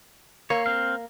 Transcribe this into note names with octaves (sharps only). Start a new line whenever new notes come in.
A#3 C#5
C4 F5